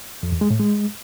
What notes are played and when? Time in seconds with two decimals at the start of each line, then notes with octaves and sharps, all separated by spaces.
0.23 F2
0.32 E2
0.41 G#3
0.50 A2
0.60 G#3